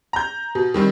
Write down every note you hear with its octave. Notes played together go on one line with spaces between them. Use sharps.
A#5 G6
B2
D#3 G3 C4